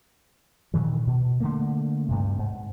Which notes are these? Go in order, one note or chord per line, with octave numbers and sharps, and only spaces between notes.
A#2 D#3 E3
B2
D3 D#3 A3 A#3
D2 G2 C3
G#2